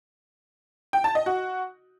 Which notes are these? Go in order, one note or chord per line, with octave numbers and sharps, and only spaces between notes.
G5
A5
D#5
F#4